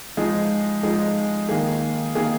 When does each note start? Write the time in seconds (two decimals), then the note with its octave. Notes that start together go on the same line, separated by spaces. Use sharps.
0.17 F3 G#3 D#4 G#4
0.83 F3 G#3 D#4 G#4
1.49 D#3 A#3 G#4
2.15 D#3 A#3 G#4